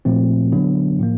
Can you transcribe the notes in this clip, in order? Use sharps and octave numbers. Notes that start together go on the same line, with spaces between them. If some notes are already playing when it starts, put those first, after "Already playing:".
A#2 F3 A3 C4
D3 F#3 B3 D4
A2 F3 A#3